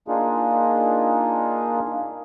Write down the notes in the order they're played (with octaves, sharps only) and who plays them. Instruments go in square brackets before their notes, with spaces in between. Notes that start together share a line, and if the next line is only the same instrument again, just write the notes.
[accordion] A#3 D4 D#4 F4 G#4